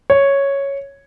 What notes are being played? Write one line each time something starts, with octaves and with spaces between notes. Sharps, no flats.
C#5